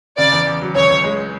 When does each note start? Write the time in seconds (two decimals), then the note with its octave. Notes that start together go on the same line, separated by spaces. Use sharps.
0.18 C#3 D5
0.32 E2
0.47 E2
0.61 F#3
0.75 C#2 C#5
0.90 C#2
1.04 G#3